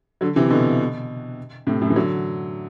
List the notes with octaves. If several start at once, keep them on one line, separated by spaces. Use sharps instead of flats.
D3 F#3
C3 E3
B2 D3
A2 C3
F#2 A2
E3
D3 F#3